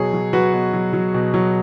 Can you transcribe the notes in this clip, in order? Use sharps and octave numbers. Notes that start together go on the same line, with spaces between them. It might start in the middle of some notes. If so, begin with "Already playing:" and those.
Already playing: B2 F#3 G#4 C#5
F#3
F#3 F#4 B4
B2
F#3
F#3
B2
F#3